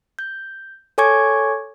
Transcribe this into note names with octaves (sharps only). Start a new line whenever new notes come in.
G6
A4 C#5 G#5 C#6 D6 G#6